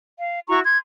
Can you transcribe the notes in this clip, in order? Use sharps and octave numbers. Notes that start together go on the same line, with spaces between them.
F5
E4 F#4 A#5 C#6
C6 G#6